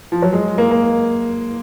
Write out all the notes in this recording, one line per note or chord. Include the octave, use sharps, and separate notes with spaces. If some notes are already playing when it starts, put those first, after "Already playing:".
F3
F#3
G#3
A#3
A#3